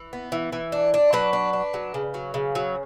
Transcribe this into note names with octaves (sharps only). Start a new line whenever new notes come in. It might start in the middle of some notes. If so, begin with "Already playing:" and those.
Already playing: E3
B3
E3
E3
D4
D4
F#3 B4
D4
D4
F#3
C#3
F#3
C#3
F#3